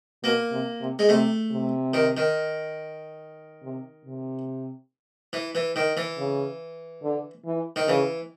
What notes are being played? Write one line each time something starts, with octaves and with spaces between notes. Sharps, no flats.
B2 A#3
C3
C3
G#3
C3 A3
C3
D#3
D#3
C3
C3
E3
E3
D#3
E3
C#3
D3
E3
D#3
C#3 E3